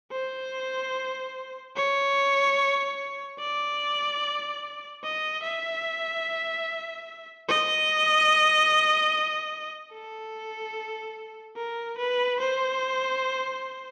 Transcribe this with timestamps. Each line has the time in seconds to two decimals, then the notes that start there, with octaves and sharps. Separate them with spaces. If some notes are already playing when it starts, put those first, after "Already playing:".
0.12 C5
1.76 C#5
3.40 D5
5.04 D#5
5.44 E5
7.49 D#5
9.93 A4
11.57 A#4
11.98 B4
12.40 C5